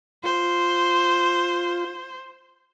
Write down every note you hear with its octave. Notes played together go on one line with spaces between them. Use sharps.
F4 C5